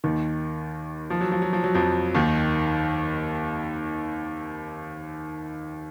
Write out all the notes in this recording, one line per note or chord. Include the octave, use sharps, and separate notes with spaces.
D#2 D#3
F3
F#3
F3
F#3
F3
F#3
F2 F3
D#2 D#3